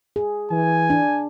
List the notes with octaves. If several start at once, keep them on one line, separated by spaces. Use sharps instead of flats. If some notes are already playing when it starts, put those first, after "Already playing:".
G#4
E3 G#5
D4